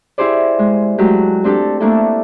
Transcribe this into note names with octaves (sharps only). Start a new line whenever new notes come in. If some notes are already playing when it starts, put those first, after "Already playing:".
E4 G4 G#4 C5 D5
G#3
F#3 G#3 A3 G4
C4 D4 G4 A4
A3 A#3 D4 E4 A4